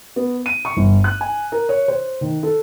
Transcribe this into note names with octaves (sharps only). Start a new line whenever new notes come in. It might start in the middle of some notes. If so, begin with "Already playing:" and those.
B3
D#7
C#6
G1
F#6
G#5
A#4
C#5
C5
D#3
A4